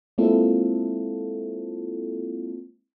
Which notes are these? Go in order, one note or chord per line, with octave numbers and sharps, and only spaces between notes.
G#3 A#3 C4 E4 F4 A4